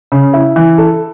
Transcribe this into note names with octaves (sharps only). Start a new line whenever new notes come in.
C#3
E4
E3
A4